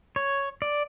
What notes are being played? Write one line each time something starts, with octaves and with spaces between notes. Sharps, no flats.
C#5
D5